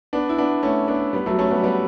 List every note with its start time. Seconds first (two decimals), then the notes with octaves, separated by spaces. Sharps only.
0.13 B3 D4
0.29 E4
0.38 B3 D4
0.63 A3 C#4
0.88 B3 D4
1.13 G3 B3
1.26 F#3 A3
1.38 A3 C#4
1.51 G3 B3
1.63 G3 B3